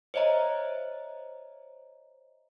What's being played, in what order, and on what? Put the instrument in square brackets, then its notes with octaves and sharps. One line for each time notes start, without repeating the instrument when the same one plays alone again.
[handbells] C5 C#5 D#5 E5 A#5